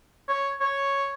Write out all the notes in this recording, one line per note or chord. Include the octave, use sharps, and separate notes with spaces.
C#5
C#5